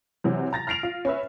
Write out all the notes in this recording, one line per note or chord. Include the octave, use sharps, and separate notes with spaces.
C3 E3 F#3
A#5 A6 A#6
F6 A#6 C7 D7 F7
F4
C#4 B4 E5